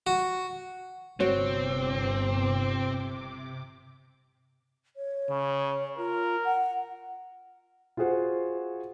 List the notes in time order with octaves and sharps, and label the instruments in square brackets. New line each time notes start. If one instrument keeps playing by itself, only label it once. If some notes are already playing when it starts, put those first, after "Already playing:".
[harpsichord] F#4
[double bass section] G1 [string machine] C3 D6 [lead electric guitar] C4 [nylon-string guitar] F#4 C#5
[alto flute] C#5
[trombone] C#3
[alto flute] F4 [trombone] A#4
[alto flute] F#5
[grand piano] F4 F#4 G#4 C5 F#5